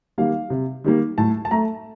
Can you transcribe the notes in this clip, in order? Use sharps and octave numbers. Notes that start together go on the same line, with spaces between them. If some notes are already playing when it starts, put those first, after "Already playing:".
D#3 G3 A#3 F5
C3
D#3 G3 A#3
A2 A5
A5
A3 A#5